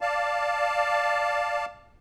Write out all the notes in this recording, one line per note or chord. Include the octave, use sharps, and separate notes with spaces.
D5 F5 A5